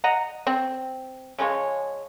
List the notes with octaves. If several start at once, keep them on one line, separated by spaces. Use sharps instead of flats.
D#5 F#5 A#5
C4
C#3 F3 G#3 C#5